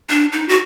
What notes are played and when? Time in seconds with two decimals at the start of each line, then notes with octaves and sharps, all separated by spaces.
0.09 D4
0.32 D#4
0.49 F#4